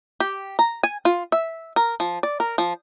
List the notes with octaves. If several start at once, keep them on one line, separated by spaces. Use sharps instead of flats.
G4
A#5
G#5
F4
E5
A#4
F3
D5
A#4
F3